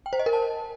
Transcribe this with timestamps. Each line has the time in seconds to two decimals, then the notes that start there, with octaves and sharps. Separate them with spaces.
0.06 G5
0.13 C5
0.19 D#5
0.26 A#4
0.33 A5